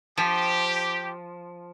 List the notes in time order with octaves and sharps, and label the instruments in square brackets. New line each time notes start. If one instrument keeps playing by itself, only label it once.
[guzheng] F3 [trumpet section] G4